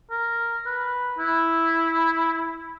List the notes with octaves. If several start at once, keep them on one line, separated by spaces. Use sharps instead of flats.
A#4
B4
E4